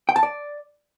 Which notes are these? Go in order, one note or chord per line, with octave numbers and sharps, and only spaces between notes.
G5
A5
D5